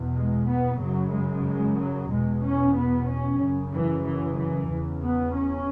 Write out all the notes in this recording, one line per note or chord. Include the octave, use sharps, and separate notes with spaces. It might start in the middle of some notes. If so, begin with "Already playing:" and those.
Already playing: E2 B2
G#3
B3
F#2 C#3 F#3
G#3
G#3
F#3
E2 B2 G#3
C#4
B3
C#4
F#2 C#3
E3
E3
E3
E2 C#3
B3
C#4